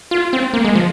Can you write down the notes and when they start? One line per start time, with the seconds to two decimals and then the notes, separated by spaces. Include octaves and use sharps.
0.11 F4
0.33 C4
0.54 A#3
0.65 G#3
0.75 F3